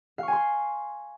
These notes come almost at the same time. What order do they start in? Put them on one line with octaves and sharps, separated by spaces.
F5 C#6 G#5 C6